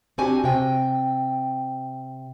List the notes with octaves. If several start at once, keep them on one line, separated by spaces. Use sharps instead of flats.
C4 D4 F#4 G4 G#5
C3 G5